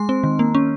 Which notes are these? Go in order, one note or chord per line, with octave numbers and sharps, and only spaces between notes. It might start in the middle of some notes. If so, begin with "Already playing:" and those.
Already playing: G#3 C6
C4
D#3
A#3
C#4